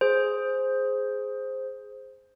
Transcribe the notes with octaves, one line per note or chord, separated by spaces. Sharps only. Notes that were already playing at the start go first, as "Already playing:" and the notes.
G#4 C5